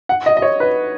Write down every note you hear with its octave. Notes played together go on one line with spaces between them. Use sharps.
F#5
D#5
D#5
C#5
B4